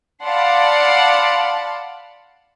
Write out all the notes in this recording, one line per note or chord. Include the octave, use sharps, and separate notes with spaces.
D5 F5 F#5 A5 B5 C6